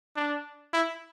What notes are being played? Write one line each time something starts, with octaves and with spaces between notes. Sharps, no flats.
D4
E4